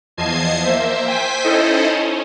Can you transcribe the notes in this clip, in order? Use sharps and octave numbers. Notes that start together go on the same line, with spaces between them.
E2 F3 D#5 A5 G#6 C7
A#3 C5 E5
C5 G5 G#5 B6
C#4 D#4 E4 A4 C5 D#5
C#4